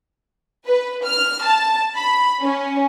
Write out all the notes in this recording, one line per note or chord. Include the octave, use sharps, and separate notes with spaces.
B4
F6
A5
B5
C#4